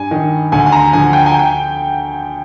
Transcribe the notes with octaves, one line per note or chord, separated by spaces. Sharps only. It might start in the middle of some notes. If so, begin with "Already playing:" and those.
Already playing: G2 G#5
D#3
D2 G#5
G#5
A#5
D3 F3 G#5
G5
G#5
G5